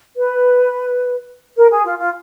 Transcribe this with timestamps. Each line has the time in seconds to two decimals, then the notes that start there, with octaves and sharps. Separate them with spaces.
0.15 B4
1.57 A#4
1.70 G#4
1.85 F4
1.99 F4